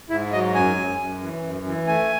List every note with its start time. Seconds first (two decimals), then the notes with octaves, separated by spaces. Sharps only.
0.10 G#2 E4
0.32 F#3 D#5
0.54 F#2 G#5
0.77 F#2
0.99 F#2
1.21 E3
1.43 F#2
1.66 E3
1.87 A3 G#5